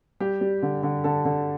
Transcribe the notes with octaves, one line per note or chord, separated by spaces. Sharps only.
G3 G4
G3
D3
D3
D3 A4
D3